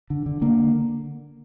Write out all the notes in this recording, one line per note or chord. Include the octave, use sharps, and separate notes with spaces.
D3
D3
D3 A#3